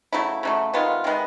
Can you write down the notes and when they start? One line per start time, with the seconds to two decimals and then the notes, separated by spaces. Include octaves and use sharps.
0.13 C#3 F#3 A3 E4
0.43 C#3 F#3 A3
0.74 C3 D#3 G#3 B3 F4
1.04 C3 D#3 G#3 B3